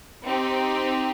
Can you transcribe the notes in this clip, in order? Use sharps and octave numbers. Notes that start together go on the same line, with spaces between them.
C4 D#4 G4